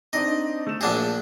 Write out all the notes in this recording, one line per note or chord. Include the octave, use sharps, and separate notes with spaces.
C4 D4 D#4 D#5
A3 E7
A#1 D4 G#4